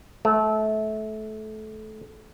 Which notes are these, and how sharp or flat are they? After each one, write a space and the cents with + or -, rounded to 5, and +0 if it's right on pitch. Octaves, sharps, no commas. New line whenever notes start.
A3 -25